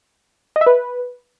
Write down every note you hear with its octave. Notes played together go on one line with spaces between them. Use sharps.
D#5
E5
B4